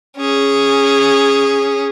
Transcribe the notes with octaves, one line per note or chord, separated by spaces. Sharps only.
C#4 G#4